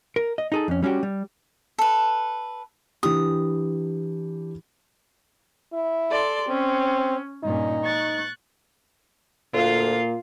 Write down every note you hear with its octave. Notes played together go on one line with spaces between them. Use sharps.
A#4
D#5
D#4 G#4 A4
F2 C#4
G3 C#4 D#4 F#4 G4
G3
A4 B4
E3 D4 G4 D#6
E4
A4 D5 C6
C4 C#4
G2 A#2 C#4 D#4
C#6 F#6 A6
D2 A#2 F4 F5